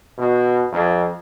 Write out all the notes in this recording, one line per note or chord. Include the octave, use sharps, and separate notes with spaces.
B2
F2